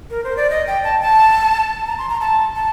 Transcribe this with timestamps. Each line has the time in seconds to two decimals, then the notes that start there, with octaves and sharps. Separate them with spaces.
0.10 A#4
0.24 C5
0.37 D5
0.50 D#5
0.67 G5
0.84 A5
1.01 A5
1.87 A#5
1.98 C6
2.09 A#5
2.20 A5
2.55 A5